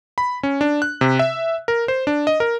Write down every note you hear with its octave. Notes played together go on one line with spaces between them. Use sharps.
B5
C#4
D4
F#6
C3
E5
A#4
C5
D4
D#5
A#4